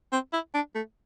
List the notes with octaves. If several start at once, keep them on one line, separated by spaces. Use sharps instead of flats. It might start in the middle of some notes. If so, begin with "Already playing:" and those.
C4
E4
D4
A3